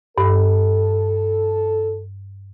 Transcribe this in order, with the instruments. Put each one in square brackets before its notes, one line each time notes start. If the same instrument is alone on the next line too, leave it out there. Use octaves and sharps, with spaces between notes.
[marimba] G2 [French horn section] A4